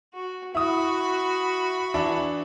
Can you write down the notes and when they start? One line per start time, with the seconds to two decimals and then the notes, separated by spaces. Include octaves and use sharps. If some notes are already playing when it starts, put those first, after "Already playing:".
0.14 F#4
0.55 E4 F#4 B5 D#6
1.94 E3 D4 E4